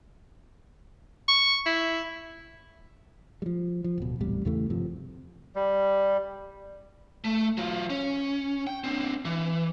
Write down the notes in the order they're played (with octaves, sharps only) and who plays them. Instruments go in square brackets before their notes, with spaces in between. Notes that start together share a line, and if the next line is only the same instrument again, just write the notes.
[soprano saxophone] C#6
E4
[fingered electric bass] F3 G3
F3
D1 B2
D#1 A1 C3 G3
E2 C#3 E3 A3
G1 C3 F3
[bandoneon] G3
[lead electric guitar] A3
F#3 F4
C#4
G5
C4 D4
E3